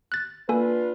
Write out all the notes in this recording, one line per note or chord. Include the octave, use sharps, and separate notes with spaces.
F#6 A6
A#3 D4 F4 A4 B4 G#5